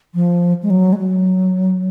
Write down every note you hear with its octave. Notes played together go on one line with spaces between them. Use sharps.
F3
G#3
F#3
G#3
F#3